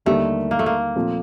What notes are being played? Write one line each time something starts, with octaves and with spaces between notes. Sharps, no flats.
D#2 D3 G3 A3 A#3 D#4
A#3
A3
A#3
A#2 F3 A3 C4